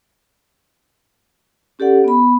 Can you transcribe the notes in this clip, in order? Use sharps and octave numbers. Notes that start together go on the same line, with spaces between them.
C#4 G4 A4 D5 F#5
B3 B5